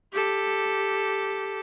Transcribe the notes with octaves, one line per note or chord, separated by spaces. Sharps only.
G4 A4